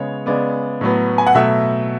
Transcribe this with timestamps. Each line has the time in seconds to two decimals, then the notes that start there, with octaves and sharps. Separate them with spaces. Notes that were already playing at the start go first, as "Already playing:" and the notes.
Already playing: C#3 G#3 B3 C#5
0.26 C#3 G#3 B3 D5
0.81 A2 F#3 B3
1.18 G#5
1.26 F#5
1.35 B2 F#3 A3 E5